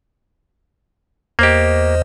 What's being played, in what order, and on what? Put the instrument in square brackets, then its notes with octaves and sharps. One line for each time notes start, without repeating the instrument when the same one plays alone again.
[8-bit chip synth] E2 C5 D#5 [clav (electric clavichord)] A#3 G4